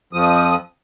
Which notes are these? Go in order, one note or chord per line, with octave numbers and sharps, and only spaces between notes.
F2 F3 D#6